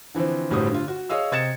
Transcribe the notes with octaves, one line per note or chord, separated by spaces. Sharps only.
D3 E3 F3 C4
G1 A2 G3 F#4 C5 D#6
D3 F4
F#4
G#4 C#5 D#5 F5 E6
C3 D#5 G#6 A6 C#7 E7